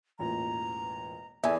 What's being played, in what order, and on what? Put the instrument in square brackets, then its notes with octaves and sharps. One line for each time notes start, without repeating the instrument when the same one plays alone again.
[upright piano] E1 A1 A#2 [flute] A#5
[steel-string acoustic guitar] E2 [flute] A4 [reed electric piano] E5 G#5